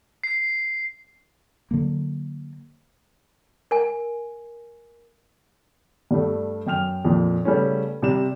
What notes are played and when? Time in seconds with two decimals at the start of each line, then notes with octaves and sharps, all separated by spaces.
0.24 C7
1.71 D3 F#3 A#3
3.71 A#4 G#5
6.11 G2 G3 A3
6.67 F#2 G5 F6 F7
7.05 F2 A#2
7.45 C#3 G3 A3 B3 C#4
8.02 C3 G3 E7